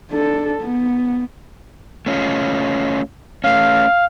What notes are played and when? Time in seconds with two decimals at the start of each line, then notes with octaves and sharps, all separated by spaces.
0.11 D4 A4
0.62 B3
2.06 A3 C#4 F4
3.44 A3 C#4 F5